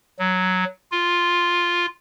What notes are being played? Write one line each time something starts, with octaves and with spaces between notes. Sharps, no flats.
F#3
F4